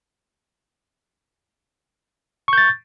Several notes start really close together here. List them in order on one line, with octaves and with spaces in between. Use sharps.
C#6 G6 A6